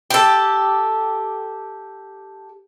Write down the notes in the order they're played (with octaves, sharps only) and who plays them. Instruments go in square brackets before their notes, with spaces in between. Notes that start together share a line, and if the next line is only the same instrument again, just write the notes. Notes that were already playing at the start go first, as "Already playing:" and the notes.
[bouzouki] G4 A4